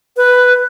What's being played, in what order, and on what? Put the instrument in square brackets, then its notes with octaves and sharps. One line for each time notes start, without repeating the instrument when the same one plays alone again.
[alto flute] B4